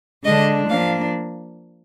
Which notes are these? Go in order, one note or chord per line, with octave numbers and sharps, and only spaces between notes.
D3 G#3 D4 D#5
F3 A#3 D4 F5